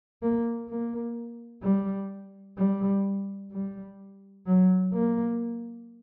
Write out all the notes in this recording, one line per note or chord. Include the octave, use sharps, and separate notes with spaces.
A#3
A#3
G3
G3
G3
F#3
A#3